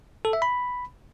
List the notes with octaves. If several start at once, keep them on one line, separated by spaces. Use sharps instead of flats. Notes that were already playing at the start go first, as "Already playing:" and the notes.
A4
E5
B5